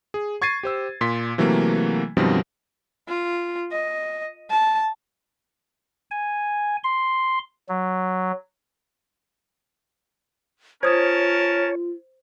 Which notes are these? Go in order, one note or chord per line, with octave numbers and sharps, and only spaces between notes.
G#4
C#6 G#6 A6 C7 D#7
G4 C5 E6
A#2 C6 B6
C3 E3 F#3 A3 A#3
F#2 B2 D#3 F3 G3 C4
F4
D#5
A5
G#5
C6
F#3
C#4 F4 A#4 C5 C#5 A5 D#6